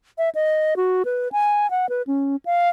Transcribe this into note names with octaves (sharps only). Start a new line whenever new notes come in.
E5
D#5
F#4
B4
G#5
F#5
B4
C#4
F5